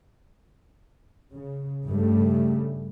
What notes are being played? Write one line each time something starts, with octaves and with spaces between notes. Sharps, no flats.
C#3
G2 C#3 G3 A3